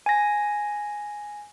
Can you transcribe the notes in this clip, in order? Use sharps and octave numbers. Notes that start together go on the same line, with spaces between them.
G#5 A#6